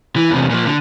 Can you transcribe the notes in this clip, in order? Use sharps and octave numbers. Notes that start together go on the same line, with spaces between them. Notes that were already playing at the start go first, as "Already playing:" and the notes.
E3
E2 C3
A#2 F3
D3